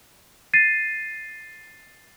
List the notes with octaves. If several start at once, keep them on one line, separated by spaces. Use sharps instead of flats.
A6 C7 D#7